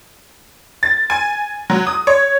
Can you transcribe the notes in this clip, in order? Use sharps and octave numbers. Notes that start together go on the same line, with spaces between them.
A6
G#5
F#3
D#6
C#5